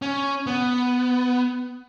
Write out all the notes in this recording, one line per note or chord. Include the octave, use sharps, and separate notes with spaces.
C#4
B3